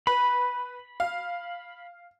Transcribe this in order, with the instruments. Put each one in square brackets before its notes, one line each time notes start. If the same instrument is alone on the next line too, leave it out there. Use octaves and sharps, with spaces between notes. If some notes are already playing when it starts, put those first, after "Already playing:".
[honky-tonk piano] B4 [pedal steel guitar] B5
[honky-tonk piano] F5